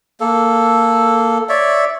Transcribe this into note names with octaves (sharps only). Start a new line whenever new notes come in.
A#3 A4
C#5 D5 E5